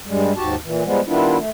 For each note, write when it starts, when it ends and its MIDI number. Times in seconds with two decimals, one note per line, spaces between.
0.07 0.32 43
0.07 0.32 55
0.07 0.32 56
0.36 0.55 39
0.36 0.55 44
0.36 0.55 66
0.36 0.55 67
0.36 0.55 81
0.64 0.83 46
0.64 0.83 52
0.85 1.00 53
0.85 1.00 55
0.85 1.00 56
0.85 1.00 59
1.07 1.37 51
1.07 1.37 55
1.07 1.37 59
1.07 1.37 62
1.07 1.37 64
1.07 1.37 65
1.37 1.50 57